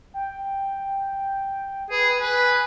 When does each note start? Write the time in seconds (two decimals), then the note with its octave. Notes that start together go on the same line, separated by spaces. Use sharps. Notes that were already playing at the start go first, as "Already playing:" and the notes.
0.14 G5
1.90 G#4 B4
2.20 B4 G#5